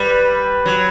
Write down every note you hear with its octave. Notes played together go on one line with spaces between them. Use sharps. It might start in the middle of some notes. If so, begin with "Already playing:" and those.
Already playing: G3 B4
F#3